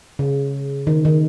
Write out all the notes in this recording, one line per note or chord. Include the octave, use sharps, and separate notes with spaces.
C#3
D#3
D#3